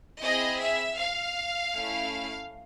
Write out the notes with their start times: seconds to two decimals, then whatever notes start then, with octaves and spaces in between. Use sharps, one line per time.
0.22 C4 E4 G#4 D#5
0.59 E5
0.98 F5
1.74 A3 C#4 E4